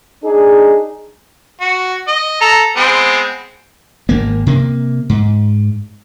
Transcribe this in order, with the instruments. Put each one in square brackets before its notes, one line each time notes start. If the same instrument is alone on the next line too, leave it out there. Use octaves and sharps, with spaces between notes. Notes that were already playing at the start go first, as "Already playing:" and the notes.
[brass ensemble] D4 D#4 G#4
[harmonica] F#4
D#5
A4 A#5
G#3 B3 C4
[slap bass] G#1 A#3
C3 A#3
G#2